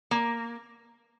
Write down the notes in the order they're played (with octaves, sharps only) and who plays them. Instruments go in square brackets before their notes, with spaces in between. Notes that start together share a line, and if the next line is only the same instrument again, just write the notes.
[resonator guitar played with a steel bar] A#3